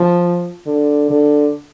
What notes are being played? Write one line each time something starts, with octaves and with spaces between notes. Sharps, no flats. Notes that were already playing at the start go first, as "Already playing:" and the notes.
Already playing: F3
D3
D3